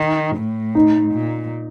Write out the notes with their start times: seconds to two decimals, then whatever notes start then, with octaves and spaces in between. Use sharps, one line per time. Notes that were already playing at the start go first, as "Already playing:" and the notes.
Already playing: D#3
0.36 A2
0.75 D#4
1.14 A#2